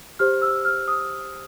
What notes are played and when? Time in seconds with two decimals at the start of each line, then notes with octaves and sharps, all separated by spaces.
0.19 G4 C5 F6
0.42 E6
0.65 F6
0.88 D#6